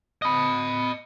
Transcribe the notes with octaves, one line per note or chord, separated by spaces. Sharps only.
D#5 B5